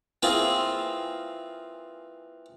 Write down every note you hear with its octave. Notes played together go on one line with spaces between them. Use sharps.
E3 A#3 C4 F4 G#4